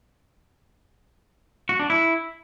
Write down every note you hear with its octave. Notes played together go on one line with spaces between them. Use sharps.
F#4
D4
E4